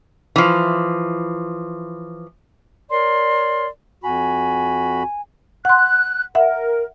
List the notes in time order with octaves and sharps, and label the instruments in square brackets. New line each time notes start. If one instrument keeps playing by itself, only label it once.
[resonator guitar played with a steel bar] E3 F3
[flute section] A#4 C#5 D5 C6
[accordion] F2 F#4 B5 [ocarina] G#5
[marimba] F#5 C6 [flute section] F#6
[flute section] A#4 [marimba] E5 F#5